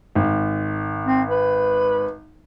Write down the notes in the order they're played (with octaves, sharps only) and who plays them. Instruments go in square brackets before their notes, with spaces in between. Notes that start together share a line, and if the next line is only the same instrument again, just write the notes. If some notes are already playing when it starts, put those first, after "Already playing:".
[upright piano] G#1
[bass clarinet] C4
B4